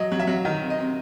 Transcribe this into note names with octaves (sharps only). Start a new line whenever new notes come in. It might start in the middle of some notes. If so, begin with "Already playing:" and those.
Already playing: F#3 D#5
F#3
E5
F#3
D#3
C3
D#5
C3